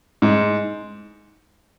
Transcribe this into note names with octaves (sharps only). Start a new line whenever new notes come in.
G#2